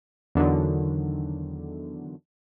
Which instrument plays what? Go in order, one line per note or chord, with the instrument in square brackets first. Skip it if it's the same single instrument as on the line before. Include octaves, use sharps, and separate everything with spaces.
[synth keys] E2 D3 D#3 F#3